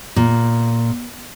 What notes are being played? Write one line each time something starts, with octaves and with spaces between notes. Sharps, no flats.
A#2